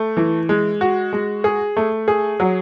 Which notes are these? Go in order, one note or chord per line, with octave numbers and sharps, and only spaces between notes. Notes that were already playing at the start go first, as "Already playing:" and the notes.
Already playing: A3
E3
G#3
F#4
G#3
G#4
A3
G#4
F#3